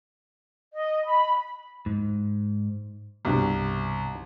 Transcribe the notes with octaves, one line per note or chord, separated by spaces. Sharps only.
D#5
B5
G#2
C2 G2 B2